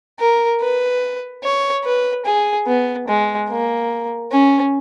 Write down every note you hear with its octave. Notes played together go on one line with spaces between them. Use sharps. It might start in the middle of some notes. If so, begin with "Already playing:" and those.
A#4
B4
C#5
B4
G#4
B3
G#3
A#3
C#4